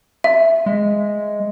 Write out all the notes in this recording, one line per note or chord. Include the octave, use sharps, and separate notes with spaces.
E5
G#3